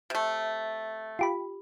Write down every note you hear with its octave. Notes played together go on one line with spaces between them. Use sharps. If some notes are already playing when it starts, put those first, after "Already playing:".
C3 A3
F4 G4 B5